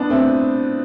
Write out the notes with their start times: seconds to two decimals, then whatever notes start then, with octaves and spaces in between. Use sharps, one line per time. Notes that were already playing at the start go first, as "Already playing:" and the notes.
Already playing: B3 D4
0.10 A3 C4